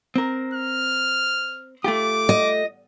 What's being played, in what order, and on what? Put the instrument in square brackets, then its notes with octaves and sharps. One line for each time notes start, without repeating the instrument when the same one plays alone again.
[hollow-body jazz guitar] C4 A#4
[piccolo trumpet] F6
[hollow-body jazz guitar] A3 F4 G4 [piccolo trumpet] D6
[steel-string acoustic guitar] D#5